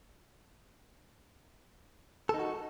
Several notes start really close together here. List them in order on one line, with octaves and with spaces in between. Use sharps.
A4 D#4 F#4